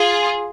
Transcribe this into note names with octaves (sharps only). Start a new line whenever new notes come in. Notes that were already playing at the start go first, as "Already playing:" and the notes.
Already playing: F4 G#4